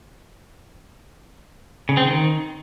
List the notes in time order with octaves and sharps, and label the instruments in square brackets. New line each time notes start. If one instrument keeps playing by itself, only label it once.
[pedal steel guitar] C#3
C4
D#3